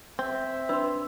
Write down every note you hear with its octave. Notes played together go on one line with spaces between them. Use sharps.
C4 E5 G6
D4 B4 C6 E6